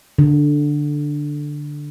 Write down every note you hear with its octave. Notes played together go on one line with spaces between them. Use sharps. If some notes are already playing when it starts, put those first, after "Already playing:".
D3